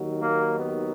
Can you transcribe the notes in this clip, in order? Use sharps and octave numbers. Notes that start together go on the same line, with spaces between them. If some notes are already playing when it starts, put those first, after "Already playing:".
Already playing: D#2 D#3 F#3
A#3
B3